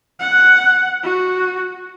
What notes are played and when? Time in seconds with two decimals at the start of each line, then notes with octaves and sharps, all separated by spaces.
0.19 F#5
1.04 F#4